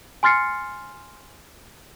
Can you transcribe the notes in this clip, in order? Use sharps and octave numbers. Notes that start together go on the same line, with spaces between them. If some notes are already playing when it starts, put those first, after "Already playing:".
G#5 C6 F6 A6 C7 C#7